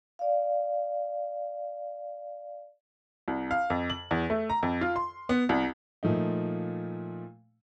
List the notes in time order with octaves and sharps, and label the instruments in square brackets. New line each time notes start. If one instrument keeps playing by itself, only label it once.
[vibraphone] D5 F5
[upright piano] C2
F5
F2
F#7
E2
A3
A#5
F2
F4
C6
B3
C2
A#2 F3 A3 D#4